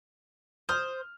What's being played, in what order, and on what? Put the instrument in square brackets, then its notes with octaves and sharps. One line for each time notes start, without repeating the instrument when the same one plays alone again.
[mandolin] C5 [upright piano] D#6 F6